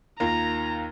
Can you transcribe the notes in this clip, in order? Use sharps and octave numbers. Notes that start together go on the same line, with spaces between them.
D#2 F4 A#4 A#5